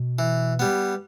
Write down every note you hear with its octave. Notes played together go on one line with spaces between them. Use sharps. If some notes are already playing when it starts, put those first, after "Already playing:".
Already playing: B2
E3
G3 B3